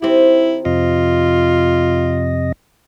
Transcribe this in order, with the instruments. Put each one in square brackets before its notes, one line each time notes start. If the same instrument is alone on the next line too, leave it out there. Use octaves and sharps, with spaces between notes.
[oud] D#3 C4 G4 [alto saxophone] E4
[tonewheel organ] F2 C3 D#5 [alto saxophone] F4